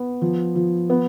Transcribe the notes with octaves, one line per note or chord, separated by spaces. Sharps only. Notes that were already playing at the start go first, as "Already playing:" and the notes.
Already playing: B3
F3
F3
B3